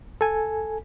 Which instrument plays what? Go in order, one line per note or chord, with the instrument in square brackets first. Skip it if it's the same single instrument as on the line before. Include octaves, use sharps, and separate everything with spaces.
[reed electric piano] A4 G#5